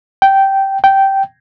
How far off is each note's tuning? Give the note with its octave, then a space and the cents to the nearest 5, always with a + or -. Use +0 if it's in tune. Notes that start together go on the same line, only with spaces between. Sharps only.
G5 -10
G5 -10